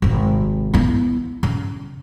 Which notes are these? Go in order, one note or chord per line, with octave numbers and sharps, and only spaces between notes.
G#1 C3
B3 E4
C#3